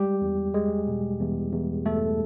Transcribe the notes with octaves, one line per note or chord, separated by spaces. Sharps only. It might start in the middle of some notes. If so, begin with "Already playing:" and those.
Already playing: G3 G#3 G4
E2
G#3 G#4
B2
E2
E2
E2 A3 A4